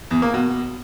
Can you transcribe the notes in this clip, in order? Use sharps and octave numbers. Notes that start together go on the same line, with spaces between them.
E2
A#3
B2